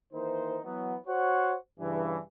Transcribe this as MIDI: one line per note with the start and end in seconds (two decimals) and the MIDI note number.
0.13 0.58 51
0.13 0.58 52
0.13 0.58 58
0.13 0.58 63
0.13 0.58 72
0.64 0.96 52
0.64 0.96 54
0.64 0.96 59
1.07 1.53 66
1.07 1.53 72
1.07 1.53 73
1.07 1.53 78
1.80 2.18 43
1.80 2.18 49
1.80 2.18 52